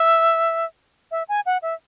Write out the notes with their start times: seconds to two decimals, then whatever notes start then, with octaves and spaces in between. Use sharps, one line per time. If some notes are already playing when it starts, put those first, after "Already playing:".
Already playing: E5
1.11 E5
1.28 G#5
1.46 F#5
1.62 E5